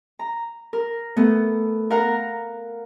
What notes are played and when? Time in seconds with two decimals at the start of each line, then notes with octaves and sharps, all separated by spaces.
0.19 A#5
0.73 A#4
1.17 A3 B3
1.90 A#4 F5 F#5 A#5